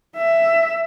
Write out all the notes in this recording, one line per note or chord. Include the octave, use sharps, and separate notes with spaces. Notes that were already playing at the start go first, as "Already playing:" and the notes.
E5